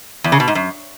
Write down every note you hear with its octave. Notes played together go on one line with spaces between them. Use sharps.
E2
C#3
B2
G#2
F#2